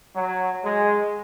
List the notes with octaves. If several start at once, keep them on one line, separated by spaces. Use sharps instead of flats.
F#3
G#3